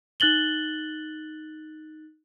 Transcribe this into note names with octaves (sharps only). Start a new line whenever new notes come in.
D#4 F#6 A6 F#7 G7